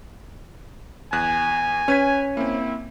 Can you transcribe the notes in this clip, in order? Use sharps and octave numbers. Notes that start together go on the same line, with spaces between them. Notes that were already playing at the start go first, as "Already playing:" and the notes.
E2 G#5 F#6
C#4 B4 G#6 B6
A#3 C4 E4